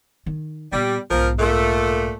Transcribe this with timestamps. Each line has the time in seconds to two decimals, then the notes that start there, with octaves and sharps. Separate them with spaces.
0.26 D#3
0.72 A#2 G3 B3
1.11 B1 G#2 F3 A#4
1.39 A#2 A3